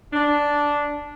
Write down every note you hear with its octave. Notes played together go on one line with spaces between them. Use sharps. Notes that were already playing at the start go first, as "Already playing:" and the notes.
D4